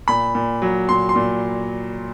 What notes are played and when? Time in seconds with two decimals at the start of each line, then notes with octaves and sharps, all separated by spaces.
0.08 A#2 B5
0.35 A#2
0.62 F#3
0.89 A#2 C6
1.09 C6
1.16 A#2